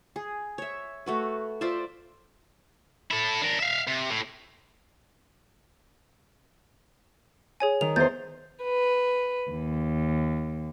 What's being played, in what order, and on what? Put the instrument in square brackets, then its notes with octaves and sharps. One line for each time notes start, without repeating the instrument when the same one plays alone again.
[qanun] G#4
C#5 E5
A3 F#4 B4
F4 C5 D5 E5
[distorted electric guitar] E4 A4
D4 A#4
E5 F5
C3
A2
[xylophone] G#4 C#5 G#5
[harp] D#3 [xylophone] F7
[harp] E2 C5 [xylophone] G6 A6
[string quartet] B4
D#2